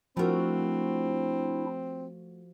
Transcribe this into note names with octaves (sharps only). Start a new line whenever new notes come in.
F3 A3 C4 D4 E4 F#4 A#4